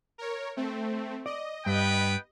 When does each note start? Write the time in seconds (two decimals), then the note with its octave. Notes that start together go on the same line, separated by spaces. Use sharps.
0.18 A#4 C#5
0.56 A3 C4
1.26 D5 D#5
1.66 G2 B3 B4 G5